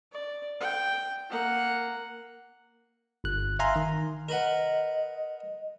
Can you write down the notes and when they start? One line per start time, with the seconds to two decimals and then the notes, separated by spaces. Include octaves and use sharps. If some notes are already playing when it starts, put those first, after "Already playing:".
0.12 D5
0.61 G5
1.30 A#3 F#5
3.24 G1 F#6
3.59 E5 F5 G#5 A#5 C6
3.76 D#3
4.29 A#4 B4 D#5 F#5